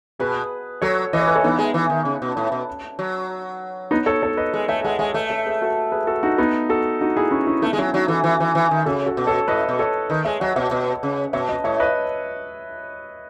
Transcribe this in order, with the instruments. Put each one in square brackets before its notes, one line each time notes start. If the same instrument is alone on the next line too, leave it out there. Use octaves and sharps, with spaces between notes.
[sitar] B2 [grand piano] G#4 B4
[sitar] F#3 [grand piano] A4 C#5
[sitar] E3 [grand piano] D#5
[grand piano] C#5
B4
A4 C#5
[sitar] E3 [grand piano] B3 D#4
[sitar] G#3
E3
D#3
C#3
B2
A2
B2
F#3
[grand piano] B3 D#4
A4 C#5
A4 C#5
B4 D#5
[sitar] G#3
[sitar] A3 [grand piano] C#5 E5
[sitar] G#3 [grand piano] D#5 F#5
[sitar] G#3 [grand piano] C#5 E5
[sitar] A3 [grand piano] B4 D#5
[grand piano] A4 C#5
G#4 B4
F#4 A4
G#4 B4
F#4 A4
D#4 F#4
B3 D#4
F#4 A4
D#4 F#4
E4 G#4
C#4 E4
C#4 E4
[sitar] A3 [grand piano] B3 D#4
[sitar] G#3
[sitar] F#3 [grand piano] C#4 E4
[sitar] F#3 [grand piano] D#4 F#4
[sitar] E3 [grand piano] F#4 A4
[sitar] E3
E3
E3
D#3
[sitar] C#3 [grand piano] F#4 A4
[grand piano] F#4 A4
[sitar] B2
[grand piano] A4 C#5
[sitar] A2 [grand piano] B4 D#5
[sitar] B2
[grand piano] A4 C#5
[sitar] D#3 [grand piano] B4 D#5
[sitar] G#3 [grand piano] C#5 E5
[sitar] F#3 [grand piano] D#5 F#5
[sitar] B2 [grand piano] C#5 E5
[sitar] B2 [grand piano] B4 D#5
[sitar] C#3
[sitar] B2 [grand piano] C#5 E5
[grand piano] B4 D#5
[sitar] A2 [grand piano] C#5 E5
[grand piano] B4 D#5